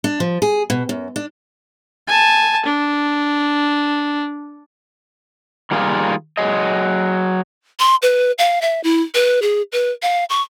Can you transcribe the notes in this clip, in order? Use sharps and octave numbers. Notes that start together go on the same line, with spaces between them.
D4
F3
G#4
B2
F#2
D4
G#5 A5
D4
D#3 G3 A#3 F4 G#4
F#3 G#4 D#5
C6
B4
F5
E5
E4
B4
G#4
B4
F5
C#6